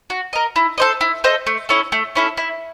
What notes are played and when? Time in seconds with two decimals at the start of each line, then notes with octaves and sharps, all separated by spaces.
0.10 F#4
0.33 A#4 D#5
0.56 E4
0.78 A4 C5 D#5
1.01 E4
1.24 A4 C5 D#5
1.47 A3
1.69 C#4 E4 A4
1.92 A3
2.15 C#4 E4 A4
2.37 E4